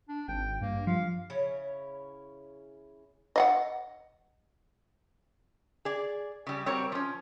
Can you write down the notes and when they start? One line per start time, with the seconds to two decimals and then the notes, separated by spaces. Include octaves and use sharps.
0.09 D4
0.28 G#1 G5
0.61 G2 A#3
0.87 F3 F5
1.30 C#3 C#4 E4 C#5
3.36 D#5 F5 F#5
5.85 G#4 D5
6.47 C#3 G3
6.66 G3 C4 F#4 A#4 C#5
6.92 F3 C#4